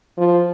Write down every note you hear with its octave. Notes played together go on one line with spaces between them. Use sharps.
F3